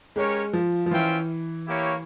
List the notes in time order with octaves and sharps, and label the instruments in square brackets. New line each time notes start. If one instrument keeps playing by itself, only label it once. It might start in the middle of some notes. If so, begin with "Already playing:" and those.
[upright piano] G#3 [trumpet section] C#4 G4 A#4 C#5
[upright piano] F3
F3
[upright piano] E3 [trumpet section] C#4 F4 C5 E5 G5
[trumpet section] A#3 E4 G4 C#5